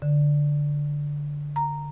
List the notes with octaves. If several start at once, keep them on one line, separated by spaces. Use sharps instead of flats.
D3
A#5